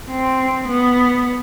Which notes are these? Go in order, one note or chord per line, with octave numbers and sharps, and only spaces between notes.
C4
B3